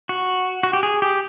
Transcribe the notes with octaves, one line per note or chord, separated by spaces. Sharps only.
F#4
F#4
G4
G#4
G4